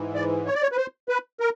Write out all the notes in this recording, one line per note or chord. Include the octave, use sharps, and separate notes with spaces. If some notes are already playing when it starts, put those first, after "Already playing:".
Already playing: G#2 E3
D5
C#5
D5
C#5
B4
C5
B4
A#4